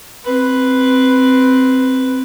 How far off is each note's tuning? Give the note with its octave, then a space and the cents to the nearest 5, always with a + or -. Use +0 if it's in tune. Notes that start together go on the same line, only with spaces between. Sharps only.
C4 +0 B4 +0